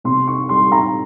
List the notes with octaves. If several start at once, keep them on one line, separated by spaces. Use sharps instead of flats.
C3 C6
C#6
G3 C6
A#5